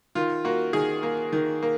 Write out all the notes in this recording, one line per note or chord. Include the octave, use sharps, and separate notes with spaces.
D#3 F4
A#3 F#4
D#3 G#4
A#3
D#3
A#3